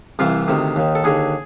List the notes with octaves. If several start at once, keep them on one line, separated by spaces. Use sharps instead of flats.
C2 C3 E3 F4
D2 C3 D#3
D#2 D#3
A4
D#2 D3 G#4